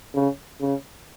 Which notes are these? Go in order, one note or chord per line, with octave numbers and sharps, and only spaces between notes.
C#3
C#3